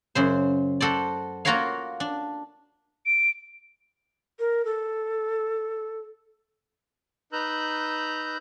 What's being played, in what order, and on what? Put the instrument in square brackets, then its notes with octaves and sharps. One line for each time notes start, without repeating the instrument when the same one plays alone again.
[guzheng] F#2 C#3 C5
F#4 A4 C5 D5
A#3 F4 F#4 A#4 C#5 F5
D4
[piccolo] D7
[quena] A#4
A4
[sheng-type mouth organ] D#4 B4 A#5 E6 F#6 G6